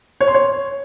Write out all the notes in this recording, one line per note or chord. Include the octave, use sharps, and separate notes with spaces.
C#5
C6
C#5